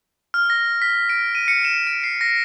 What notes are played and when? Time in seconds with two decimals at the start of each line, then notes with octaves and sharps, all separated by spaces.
0.34 F6
0.50 A#6
0.82 B6
1.09 D7
1.35 D#7
1.48 C#7
1.65 E7
1.87 D7
2.04 C7
2.21 A#6